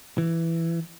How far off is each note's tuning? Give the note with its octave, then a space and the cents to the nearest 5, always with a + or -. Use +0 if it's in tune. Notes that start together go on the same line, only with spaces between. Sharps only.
E3 +10